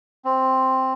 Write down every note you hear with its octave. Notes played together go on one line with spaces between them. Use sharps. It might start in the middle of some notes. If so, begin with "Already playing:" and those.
C4